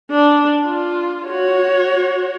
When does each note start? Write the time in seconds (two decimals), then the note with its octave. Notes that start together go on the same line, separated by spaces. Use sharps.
0.11 D4
0.66 F4
1.27 F#4 C#5